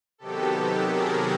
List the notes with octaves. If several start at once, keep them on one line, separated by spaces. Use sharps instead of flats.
C3 D#3 F#3 B3 G4 A4
G#4 A#4